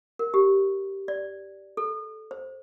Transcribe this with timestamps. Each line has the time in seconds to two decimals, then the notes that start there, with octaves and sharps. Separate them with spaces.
0.19 A#4
0.34 G4
1.08 D5
1.77 A4
2.31 C5